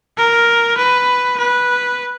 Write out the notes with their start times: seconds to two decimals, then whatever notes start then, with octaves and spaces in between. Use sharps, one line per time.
0.17 A#4
0.78 B4
1.38 B4